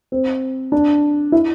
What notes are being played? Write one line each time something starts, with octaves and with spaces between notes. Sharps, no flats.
C4
D4
E4